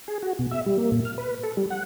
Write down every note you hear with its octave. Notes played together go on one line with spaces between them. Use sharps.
G#4
F#4
B2
E5
G3
A#3
A#2
F6
B4
A4
G3
F#5